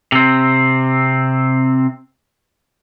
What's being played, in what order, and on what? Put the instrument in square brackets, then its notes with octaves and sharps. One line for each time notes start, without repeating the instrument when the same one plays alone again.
[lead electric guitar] C3 C4